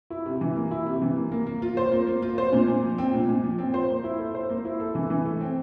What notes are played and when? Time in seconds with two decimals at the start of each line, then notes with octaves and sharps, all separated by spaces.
0.10 E4
0.26 C3
0.41 E3
0.56 A#3
0.71 E4
0.86 C3
1.02 E3
1.16 A#3
1.32 A#3
1.47 A#3
1.62 F4
1.77 C5
1.92 A#3
2.07 A#3
2.22 F4
2.38 C5
2.53 A#2
2.68 A#2
2.83 F3
2.98 C4
3.13 A#2
3.29 A#2
3.43 F3
3.59 C4
3.74 C5
3.89 A#3
4.04 E4
4.19 A4
4.35 C5
4.49 A#3
4.65 E4
4.80 A4
4.95 E3
5.10 E3
5.25 A3
5.41 C4